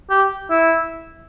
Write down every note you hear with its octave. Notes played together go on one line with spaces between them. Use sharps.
G4
E4